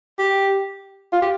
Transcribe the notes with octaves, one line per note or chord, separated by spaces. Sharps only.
G4
F4
G4